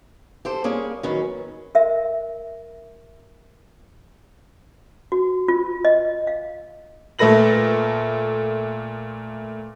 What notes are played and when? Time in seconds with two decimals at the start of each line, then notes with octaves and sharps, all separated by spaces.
0.45 G4 A4 C5
0.64 G3 A#3 C#4 G#4
1.03 D#3 F#3 C#4 B4
1.75 A#4 E5
5.12 F#4
5.48 F4
5.85 D#5
6.27 F5
7.19 A#2 A3 A4 B4 A#6 F#7